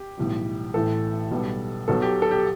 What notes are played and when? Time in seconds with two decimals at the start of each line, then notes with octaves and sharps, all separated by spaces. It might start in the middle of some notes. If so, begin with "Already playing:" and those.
Already playing: G4
0.17 B1 A2 E3 G3
0.74 A1 A2 E3 A4
1.31 B1 B2 G3
1.88 B1 B2 F#3 A4
2.02 G4
2.22 A4
2.31 G4